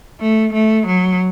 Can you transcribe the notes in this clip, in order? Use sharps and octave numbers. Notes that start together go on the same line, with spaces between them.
A3
A3
F#3